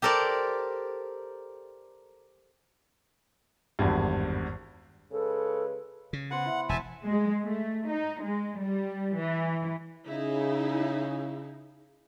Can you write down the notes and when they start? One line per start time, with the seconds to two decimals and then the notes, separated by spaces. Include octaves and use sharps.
0.02 G4 A4 A#4 C5 D5
3.79 G#1 E2 G2
5.12 C#3 G#3 A4 B4
6.13 C#3
6.31 B3 C5 F#5
6.46 E4
6.69 E1 B2 E5 G#5 A5
7.05 G#3
7.43 A3
7.89 D#4
8.23 G#3
8.61 G3
9.19 E3
10.08 C#3 D#4 E4 G#4